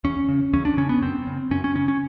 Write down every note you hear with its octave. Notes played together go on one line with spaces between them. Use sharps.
E2 C#4
C#3
E2 C#4
D4
C#3 C#4
B3
F#2 C4
C#3
F#2 C#4
C#4
C#3 C#4
C#4